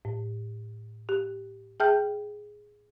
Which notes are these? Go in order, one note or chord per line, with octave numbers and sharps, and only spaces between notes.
A2
G4
G#4 E5 G5 A5 F6 G6